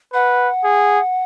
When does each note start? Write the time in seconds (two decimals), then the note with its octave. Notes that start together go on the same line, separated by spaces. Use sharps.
0.13 B4 F#5
0.64 G#4